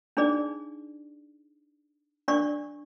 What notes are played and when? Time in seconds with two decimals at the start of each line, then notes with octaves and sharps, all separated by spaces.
0.17 D4 D#4 G#4 D5
2.28 D4 D5 C#6